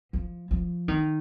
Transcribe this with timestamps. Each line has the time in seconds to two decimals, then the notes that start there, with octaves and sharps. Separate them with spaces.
0.13 F3
0.51 F3
0.88 D#3